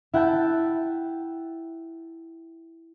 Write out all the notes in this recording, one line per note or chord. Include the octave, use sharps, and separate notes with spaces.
E4 F#5 G5 A5